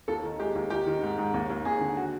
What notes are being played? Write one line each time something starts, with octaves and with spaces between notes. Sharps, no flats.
D#2 A4
D#3
G#3 G4
D#2
D#3 G4
D#3
G#2
G#2
D#2
D#2
D#2 G#4
D3
F#4